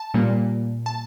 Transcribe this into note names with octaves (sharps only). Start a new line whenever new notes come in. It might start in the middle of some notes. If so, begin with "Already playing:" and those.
Already playing: A5
A#2 G3 A#3
A5